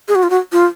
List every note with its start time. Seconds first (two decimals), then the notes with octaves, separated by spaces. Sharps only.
0.08 G#4
0.15 F#4
0.23 F4
0.30 F#4
0.52 F4